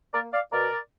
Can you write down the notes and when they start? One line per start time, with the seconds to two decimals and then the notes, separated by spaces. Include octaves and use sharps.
0.13 A#3 A#4 D5
0.32 D5 F5
0.52 B2 A#4 D5